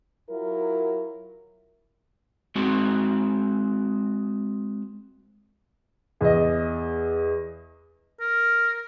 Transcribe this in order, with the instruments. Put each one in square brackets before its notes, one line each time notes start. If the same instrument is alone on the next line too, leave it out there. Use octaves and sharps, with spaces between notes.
[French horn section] F#3 E4 F4 A#4
[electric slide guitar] G#3 C4 F#4
[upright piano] E2 D#5
[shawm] A#4